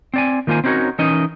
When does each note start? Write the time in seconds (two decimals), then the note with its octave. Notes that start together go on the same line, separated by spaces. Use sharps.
0.14 C4 D5 G#5
0.47 D#3 A#3 F4 C5 G#5
0.64 C4 C#4 D#4 F#4 A#4 C#5
0.99 E3 C#4 D#4 A#4 D#5